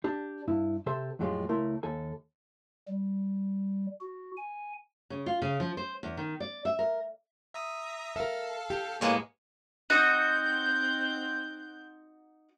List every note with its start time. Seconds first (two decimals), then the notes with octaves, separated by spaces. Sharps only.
0.04 D4 G4
0.47 G2 E4
0.86 C3 G4 A4 C5 E5 C6
1.19 F2 A2 F#3 G#3 F4 G4
1.49 C#2 A3 E4 A#4 C6
1.83 D#2 A4 G#5
2.87 G3
4.00 F#4
4.37 G#5
5.10 C#3
5.26 F4
5.42 C#3
5.60 F3
5.77 C5
6.03 E2
6.17 D#3
6.40 D5
6.65 E5
6.79 A#4
7.54 E5 A#5 D#6
8.16 A4 A#4 E5 F5
8.70 G4
9.01 A2 G#3 A#3 B3 C#5 F#5 G#5
9.90 C4 D#4 F#4 F#6 G6